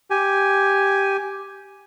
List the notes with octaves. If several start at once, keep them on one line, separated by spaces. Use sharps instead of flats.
G4 G#5